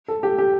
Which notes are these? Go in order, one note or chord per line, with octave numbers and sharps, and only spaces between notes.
A4
G4
G4